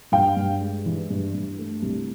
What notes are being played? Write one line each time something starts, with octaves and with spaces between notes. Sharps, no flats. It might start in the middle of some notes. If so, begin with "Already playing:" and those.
G2 F5 G5
G2
G#3
E3
G2
G2
A3
C2